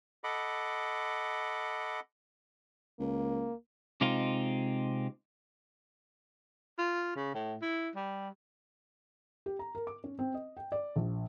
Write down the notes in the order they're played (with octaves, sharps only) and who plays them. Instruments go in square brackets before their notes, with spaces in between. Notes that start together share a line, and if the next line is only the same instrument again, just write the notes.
[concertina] A4 D#5 F#5 B5 D6
[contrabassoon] C#2 [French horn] A#3
[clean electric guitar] C3 G#3 C4 D#4 F4
[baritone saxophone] F4
C#3
A2
E4
G3
[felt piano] G4
A#5
A#4
D6
C#4
C4
D#5
G5
D5
A#1